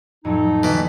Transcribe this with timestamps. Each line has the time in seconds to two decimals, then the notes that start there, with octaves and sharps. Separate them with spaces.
0.25 F2 A2 F#3 D#4
0.63 B2 D3 E3 A#5 B6